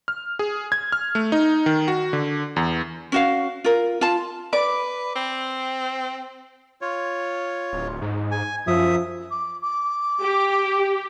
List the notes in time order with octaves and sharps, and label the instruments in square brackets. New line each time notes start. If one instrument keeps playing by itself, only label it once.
[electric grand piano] F6
G#4
G#6
F6
A3
D#4
D#3
F#4
D3
E2
[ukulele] C#4 F#4 F5
F4 A#4
F4 A5
[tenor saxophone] B4 [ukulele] D5 [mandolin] D6
[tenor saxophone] C4
[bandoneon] F4 C#5
[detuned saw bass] D1
G#2
[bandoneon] G#5
[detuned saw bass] F#2 [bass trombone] F3 [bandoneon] E5 D#6
[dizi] D6
D6
[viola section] G4